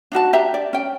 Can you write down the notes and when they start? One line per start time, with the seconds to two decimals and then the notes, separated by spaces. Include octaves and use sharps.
0.12 D4 D#4 F#4 A5
0.33 D4 G4 E5 A#5
0.54 D5
0.73 C#4 G5